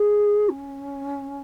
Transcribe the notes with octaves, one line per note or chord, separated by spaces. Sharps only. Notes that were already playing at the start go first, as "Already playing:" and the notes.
Already playing: G#4
C#4